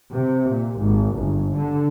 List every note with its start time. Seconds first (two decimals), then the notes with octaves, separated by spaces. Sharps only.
0.11 C3
0.50 A#2
0.80 G#1
1.17 G1
1.56 D3